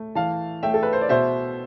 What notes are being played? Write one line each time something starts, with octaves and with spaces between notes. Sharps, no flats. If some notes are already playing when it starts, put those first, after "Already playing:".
Already playing: A3
E3 F5 A5
A3 E5 G5
A4
B4
C5
D5
B2 C5 E5